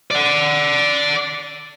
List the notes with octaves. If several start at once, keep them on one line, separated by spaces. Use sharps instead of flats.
D5 F#5